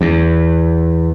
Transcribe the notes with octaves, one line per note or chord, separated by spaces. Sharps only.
E2